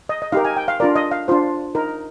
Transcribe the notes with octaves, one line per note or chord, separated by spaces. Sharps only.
D#5
D#5
D#4 G4 A#4 F5
G#5
G5
F5
D4 F4 A#4 D5
D#5
F5
D4 F4 C5
D#4 A#4